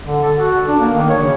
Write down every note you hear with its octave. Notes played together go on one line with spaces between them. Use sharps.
D3
A4
F#4
D4
A#3
D#3
C#5
C#3